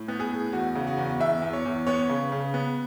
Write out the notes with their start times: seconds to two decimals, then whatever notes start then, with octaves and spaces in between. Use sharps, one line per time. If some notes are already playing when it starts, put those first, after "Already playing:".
Already playing: A2
0.08 B3
0.20 G#4
0.31 A2
0.53 E2 F#4
0.75 C#3
0.87 F#4
0.97 E2
1.20 E2 E5
1.42 E2
1.53 C#5
1.65 E2
1.87 B3 C#5
2.09 C#3
2.32 C#3
2.54 B3